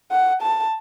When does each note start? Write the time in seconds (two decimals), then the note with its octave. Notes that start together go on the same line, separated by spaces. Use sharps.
0.11 F#5
0.42 A5